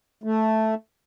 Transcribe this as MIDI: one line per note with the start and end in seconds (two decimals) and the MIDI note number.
0.24 0.75 57